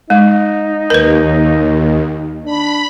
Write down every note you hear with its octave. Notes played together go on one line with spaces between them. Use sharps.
G#3 D#4
D#2 A#4 B4
D4 B5